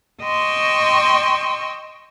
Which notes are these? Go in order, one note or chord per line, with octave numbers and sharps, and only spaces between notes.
D#5 G5 C6 C#6 E6